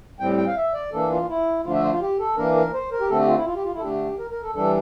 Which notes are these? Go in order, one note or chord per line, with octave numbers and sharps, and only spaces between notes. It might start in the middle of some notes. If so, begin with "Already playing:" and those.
A2 G3 C4 G5
G5
F5
E5
D5
E3 A#3 D4 A4
F4
E4
D3 F3 A3 D4 F4
E5
C5
F4
G4
A4
E3 A#3 D4 A#4
A#4
C5
A#4
G4
D3 A3 C4 A4
G4
F4
E4
F4
G4
F4
E4
A4
D3 A3 D4 G4
A#4
A#4
A4
E3 G3 D4 A4